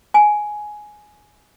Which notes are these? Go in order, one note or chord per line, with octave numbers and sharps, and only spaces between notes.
G#5